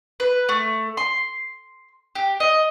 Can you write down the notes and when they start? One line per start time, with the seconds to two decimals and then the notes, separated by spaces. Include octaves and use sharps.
0.20 B4
0.49 A3
0.97 C6
2.15 G4
2.40 D#5